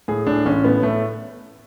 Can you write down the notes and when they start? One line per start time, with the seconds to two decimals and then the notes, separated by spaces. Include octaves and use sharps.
0.08 A2 G#4
0.27 A2 D4
0.45 A1 C#4
0.64 A2 B3
0.83 A2 A3